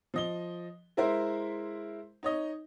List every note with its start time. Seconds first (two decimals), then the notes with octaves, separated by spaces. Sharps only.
0.14 F3 D#5 G7
0.97 G#3 E4 A#4 C5 E5
2.23 D#4 C#5 D#5